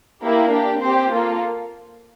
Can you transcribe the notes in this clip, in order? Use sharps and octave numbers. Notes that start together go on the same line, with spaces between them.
A#3 E4 G4
D4 G4
C4 G4 C5
A#3 F4 A4